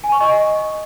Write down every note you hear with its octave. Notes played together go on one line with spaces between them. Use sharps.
G#5
C#6
D#5